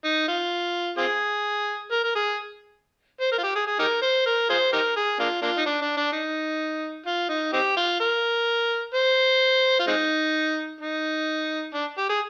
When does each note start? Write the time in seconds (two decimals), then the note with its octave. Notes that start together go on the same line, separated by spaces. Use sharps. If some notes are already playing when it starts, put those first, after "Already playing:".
0.04 D#4
0.28 F4
0.98 C4 F4 G#4
1.91 A#4
2.04 A#4
2.15 G#4
3.21 C5
3.32 A#4
3.38 F4
3.43 G4
3.55 G#4
3.67 G#4
3.79 D#4 G4 A#4
4.02 C5
4.26 A#4
4.49 F4 G#4 C5
4.73 D#4 G4 A#4
4.96 G#4
5.19 A#3 D4 F4
5.42 A#3 D4 F4
5.57 D#4
5.66 D4
5.82 D4
5.97 D4
6.12 D#4
7.06 F4
7.29 D#4
7.53 C4 D#4 G4
7.77 F4
8.00 A#4
8.94 C5
9.79 F4
9.87 G#3 C4 D#4
10.81 D#4
11.74 D4
11.98 G4
12.09 G#4